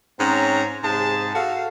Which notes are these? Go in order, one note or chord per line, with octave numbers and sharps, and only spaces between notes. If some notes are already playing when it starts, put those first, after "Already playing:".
G#2 C4 C#4 C#5 A#5
G#2 C3 G#4 A5
F#4 A4 F5